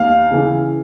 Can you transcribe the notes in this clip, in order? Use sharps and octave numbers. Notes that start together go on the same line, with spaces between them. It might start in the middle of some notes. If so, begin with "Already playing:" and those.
Already playing: D#2 F5
C#3 E3